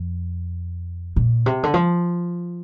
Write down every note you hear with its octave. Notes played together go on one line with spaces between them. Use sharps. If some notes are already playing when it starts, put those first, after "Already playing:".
Already playing: F2
A#2
C3
D3
F3